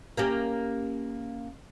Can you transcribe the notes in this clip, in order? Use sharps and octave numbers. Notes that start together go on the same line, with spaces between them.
A#3 C#4 G4